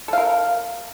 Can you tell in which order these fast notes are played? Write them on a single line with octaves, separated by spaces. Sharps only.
A4 F5 A#4